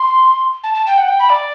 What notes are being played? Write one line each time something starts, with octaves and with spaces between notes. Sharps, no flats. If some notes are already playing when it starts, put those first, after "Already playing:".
Already playing: C6
A5
A5
G5
F#5
G5
B5
D5